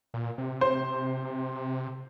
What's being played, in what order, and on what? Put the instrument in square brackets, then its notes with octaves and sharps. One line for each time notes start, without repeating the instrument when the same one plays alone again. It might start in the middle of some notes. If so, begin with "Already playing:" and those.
[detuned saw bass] A#2
C3
[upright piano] C5